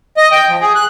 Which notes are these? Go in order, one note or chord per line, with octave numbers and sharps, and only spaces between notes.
D#5
G5
F3
G#4
F#6